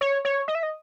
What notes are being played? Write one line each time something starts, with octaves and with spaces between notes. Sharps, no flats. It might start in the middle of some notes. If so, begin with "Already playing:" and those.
C#5
C#5
D#5
E5
D#5